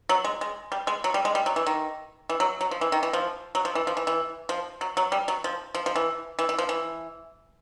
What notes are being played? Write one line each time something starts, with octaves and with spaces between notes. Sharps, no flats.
F#3
G#3
G#3
G3
G#3
F#3
G3
G#3
G3
F#3
E3
D#3
E3
F#3
F#3
F3
E3
D#3
E3
F3
F#3
F3
E3
F3
E3
E3
F3
F#3
F#3
G3
F#3
F3
F3
F3
E3
E3
E3
F3
E3